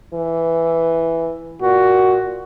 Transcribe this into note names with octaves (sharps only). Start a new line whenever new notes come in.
E3
A#2 F#4